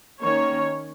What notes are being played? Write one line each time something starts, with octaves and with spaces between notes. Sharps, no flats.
D#3 A#3 C#4 C#5